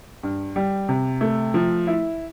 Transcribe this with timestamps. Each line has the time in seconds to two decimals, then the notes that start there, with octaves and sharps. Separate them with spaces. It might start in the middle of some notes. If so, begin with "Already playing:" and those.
0.23 G2
0.56 G3
0.89 C3
1.21 A3
1.54 F3
1.87 E4